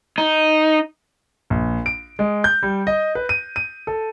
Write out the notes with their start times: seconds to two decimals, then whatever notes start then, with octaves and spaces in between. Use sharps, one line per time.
0.18 D#4
1.50 A#1
1.86 D7
2.19 G#3
2.44 G6
2.63 G3
2.87 D#5
3.15 B4
3.29 D#7
3.56 D#7
3.87 A4